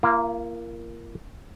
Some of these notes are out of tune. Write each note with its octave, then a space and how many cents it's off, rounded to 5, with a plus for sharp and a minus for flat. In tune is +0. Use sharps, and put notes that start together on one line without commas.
A#3 +0 F4 -45